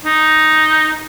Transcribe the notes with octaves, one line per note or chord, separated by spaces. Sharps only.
D#4